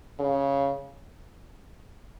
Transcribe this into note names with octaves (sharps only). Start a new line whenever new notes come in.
C#3